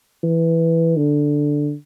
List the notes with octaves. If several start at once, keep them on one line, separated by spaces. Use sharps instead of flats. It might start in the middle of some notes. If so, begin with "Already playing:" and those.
E3
D3